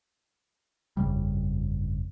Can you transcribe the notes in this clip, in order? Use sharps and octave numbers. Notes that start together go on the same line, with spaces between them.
G1 F2 C#3 G3